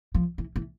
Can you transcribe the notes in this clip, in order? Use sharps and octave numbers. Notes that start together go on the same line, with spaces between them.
F3
E3
E3